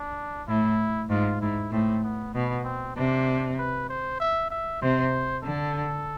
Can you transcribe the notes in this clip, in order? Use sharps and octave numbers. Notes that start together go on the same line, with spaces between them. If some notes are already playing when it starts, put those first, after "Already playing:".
Already playing: D4
A2 E4
G#2 F4
G#2 E4
A2 C4
B3
B2 B3
C4
C3 D4
B4
C5
E5
E5
C3 C5
D3 A4